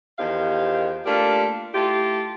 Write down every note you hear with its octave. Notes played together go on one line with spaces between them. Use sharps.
E2 D#3 F3 G4 F5
A3 A#3 D4 F4 G4
A3 E4 F4 G4